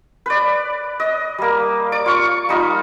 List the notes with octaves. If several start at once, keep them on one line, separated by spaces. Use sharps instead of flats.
B4 D5
D#5
G3 A#3
D5 D6
F4 C#6
G3 D#4 F4